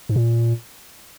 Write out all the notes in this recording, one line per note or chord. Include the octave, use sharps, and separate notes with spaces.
G#2
A#2